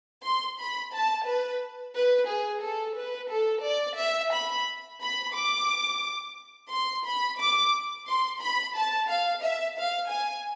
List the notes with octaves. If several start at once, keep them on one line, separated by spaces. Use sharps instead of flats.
C6
B5
A5
B4
B4
G#4
A4
B4
A4
D5
E5
B5
B5
D6
C6
B5
D6
C6
B5
A5
F5
E5
F5
G#5